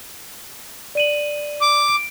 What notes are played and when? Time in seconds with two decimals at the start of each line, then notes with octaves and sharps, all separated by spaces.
0.95 D5 D#7 F#7
1.61 D6
1.88 D7